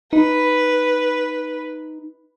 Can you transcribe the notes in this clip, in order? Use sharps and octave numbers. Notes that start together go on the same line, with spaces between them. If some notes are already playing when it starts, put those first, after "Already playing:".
D#4 B4